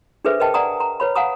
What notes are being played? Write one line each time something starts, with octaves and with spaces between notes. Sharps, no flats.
D4 G#4 A4 B4 C5 E5
A#4 B4 D#5 G5 A5
D5 F#5 G#5 A#5 D#6
A#5
B4 C#5 B5
F5 F#5 G#5 A#5 D#6